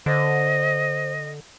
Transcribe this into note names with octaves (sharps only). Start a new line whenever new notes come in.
D3 C5 D#5